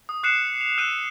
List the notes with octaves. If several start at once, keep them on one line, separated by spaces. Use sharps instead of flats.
D#6
D6 F#6 C7 C#7 E7
F7
E6 F#6 G6 D#7